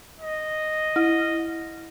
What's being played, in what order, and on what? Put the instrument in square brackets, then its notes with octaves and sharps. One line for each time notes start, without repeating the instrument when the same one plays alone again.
[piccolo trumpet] D#5
[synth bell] E4